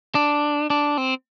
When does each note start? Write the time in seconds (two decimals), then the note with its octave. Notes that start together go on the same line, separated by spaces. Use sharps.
0.15 D4
0.70 D4
0.98 C4